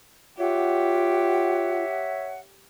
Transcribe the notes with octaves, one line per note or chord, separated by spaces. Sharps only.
F4 G4 C#5 E5 F#5